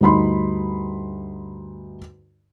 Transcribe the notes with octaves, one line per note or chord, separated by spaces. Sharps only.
D2 G2 D#4 B5 C6